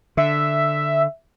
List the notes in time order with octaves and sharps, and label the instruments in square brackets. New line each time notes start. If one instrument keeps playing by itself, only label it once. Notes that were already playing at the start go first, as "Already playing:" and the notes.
[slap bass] D3 [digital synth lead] E5